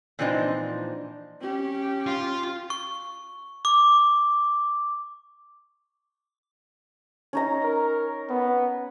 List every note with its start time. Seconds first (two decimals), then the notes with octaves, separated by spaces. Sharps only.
0.19 A#2 E3 F3 C4 D4 D#4
1.40 C#4 G4
2.07 F4
2.70 C#6
3.65 D6
7.33 C#4 D#4 A#5
7.63 A#4
8.30 B3